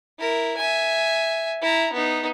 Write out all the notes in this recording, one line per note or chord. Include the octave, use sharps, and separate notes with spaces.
E4 A#4
E5 G#5
E4 A#5
B3 D#4